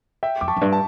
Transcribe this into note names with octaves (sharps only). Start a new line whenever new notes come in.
E5 G5
F2 D6
A5 C#6
F2
G2
A5